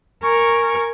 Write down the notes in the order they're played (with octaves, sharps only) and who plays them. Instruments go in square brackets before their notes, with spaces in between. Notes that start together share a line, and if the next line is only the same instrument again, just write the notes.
[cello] A#4 [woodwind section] G#5 C#6